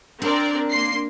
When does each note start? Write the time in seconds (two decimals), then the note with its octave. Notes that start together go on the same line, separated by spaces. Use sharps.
0.22 C4 D4 A#4 D5
0.72 A#3 C6 C7